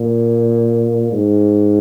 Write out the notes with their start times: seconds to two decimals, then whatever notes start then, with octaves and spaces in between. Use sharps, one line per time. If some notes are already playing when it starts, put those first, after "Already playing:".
Already playing: A#2
1.12 G#2